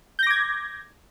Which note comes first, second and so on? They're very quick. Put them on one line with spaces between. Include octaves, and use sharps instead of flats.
G6 A#6 D6 G#6